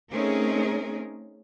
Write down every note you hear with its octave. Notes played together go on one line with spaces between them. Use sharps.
A3 C4 C#4 D#4 G#4 A#4